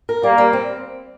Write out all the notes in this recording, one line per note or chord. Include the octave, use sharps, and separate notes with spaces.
A#4
G3 A#3
G3
C4